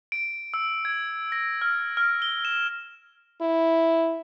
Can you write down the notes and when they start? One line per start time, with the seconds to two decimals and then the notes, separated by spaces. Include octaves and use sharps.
0.12 D7
0.54 E6
0.85 G#6
1.32 A#6
1.62 F6
1.97 F6
2.22 G7
2.45 E7
3.42 E4